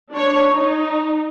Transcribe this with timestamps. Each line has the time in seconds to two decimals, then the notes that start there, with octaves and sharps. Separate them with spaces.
0.11 D4 C#5
0.51 D#4